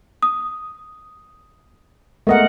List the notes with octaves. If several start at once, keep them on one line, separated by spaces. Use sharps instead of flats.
D#6
G#3 A3 B3 A#4 D#5 F#5